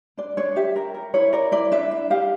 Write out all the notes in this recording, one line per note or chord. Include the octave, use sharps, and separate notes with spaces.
D4 D5
D4 C#5
G4 E5
A#4
A#4
E4 C#5
A#4 D5
E4 D5
D4 E5
D4
G4 F5